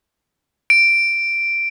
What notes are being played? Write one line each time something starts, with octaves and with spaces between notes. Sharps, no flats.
D7